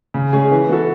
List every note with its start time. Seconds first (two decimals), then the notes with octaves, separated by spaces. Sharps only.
0.14 C#3
0.33 G#3 C#4 G#4
0.52 E3
0.68 B3 F#4 A4